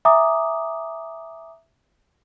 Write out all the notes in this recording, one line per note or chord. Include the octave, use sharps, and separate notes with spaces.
E5 G#5 A#5 D6 D#6